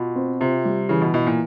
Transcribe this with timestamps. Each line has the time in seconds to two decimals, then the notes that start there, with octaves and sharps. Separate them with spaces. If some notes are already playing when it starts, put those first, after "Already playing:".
Already playing: B2 F4
0.16 C4
0.40 C3 F4
0.65 G3
0.89 C#3 E3
1.02 B2
1.14 B2 E3
1.27 A#2